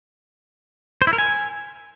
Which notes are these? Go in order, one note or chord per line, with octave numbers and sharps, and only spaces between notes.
C5
E4
A#4
G#5